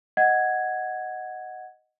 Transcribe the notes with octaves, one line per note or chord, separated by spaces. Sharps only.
D#5 F#5 G#6